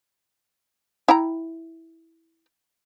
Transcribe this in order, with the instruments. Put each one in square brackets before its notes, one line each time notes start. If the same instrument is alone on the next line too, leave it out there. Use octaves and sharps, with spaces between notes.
[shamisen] E4 G5 A#5